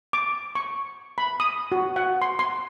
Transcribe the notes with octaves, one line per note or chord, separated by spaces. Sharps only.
D6
C#6
B5
D#6
F#4
F#5
C6
C6